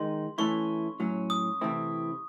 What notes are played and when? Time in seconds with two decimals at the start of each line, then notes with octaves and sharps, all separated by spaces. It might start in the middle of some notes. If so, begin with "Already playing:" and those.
Already playing: D#3 G#3 D#4 C6
0.38 E3 A3 C#4 E4 C#6
1.00 A2 F#3 C#4
1.30 D#6
1.61 C3 E3 A3 C4 E4